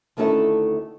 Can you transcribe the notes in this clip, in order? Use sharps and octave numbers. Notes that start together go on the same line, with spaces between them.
D2 D#3 A3 C#4 E4 A4